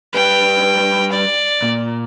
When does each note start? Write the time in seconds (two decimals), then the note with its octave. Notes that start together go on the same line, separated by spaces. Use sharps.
0.14 G3 B4 G5
1.12 D5
1.62 A#2